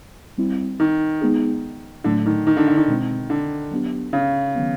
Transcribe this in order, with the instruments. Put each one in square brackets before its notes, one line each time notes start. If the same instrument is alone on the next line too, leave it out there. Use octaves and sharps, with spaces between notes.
[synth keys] G3 C4 E4
[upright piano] D#3
[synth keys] G#3 B3 D#4 G#4
[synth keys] A2 F#3 A3 D4 [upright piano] D3
[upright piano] D#3
D#3
D3
D3
D#3
[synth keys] B2 G#3 C4
[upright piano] D3
[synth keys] F#3 B3 D4 G4
[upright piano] C#3
[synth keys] D#3 F#3 B3